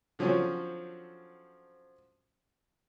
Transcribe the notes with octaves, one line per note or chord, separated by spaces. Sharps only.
D3 F3 F#3 C4 C#4